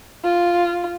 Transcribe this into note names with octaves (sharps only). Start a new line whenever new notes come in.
F4